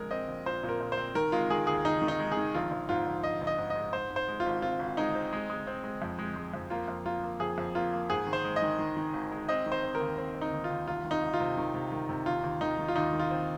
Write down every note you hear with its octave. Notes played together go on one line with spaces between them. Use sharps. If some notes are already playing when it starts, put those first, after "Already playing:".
Already playing: A#1 G#3 A#4
C4 D#5
A#1
A#2 C5
A#2
A#4
A#2
C5
C4
D#3 A#4
G#3 F4
D#3 G#4
D#2 G#4
D#3 D#4
D#3
D#4
G#3
G#4
D#3
A#1 F4
A#1
G#2 F4
A#1
A#1 D#5
A#1
D#5
G#2
D#5
G#3
G#2 C5
G#2
C5
G#3
F4
G#1
C4 F4
G#1
G#3 D#4
C4
G#3
G#3
C4
G#3
F2
G#3
G#3
F2
A#3 F4
F2
A#3 F4
A#3
F2 G#4
F2
A#3 F4
A#3
G#2 G#4
D#3
C5
G#3
D#5
D#3
D#3
D#3
G#1
G#3
C4 D#5
D#3
C5
C4
A#4
D#2
C4
C4
D#4
D#2
F4
D#2
C2 F4
D#3
D#4
C2
F4
C3
D#3
C3
D#3
C3
D#2 F4
D#2
D#3 D#4
D#3
F4
D#2 D#4
D#3
F4
C4